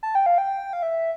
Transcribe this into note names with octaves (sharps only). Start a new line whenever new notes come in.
A5
G5
F5
G5
F5
E5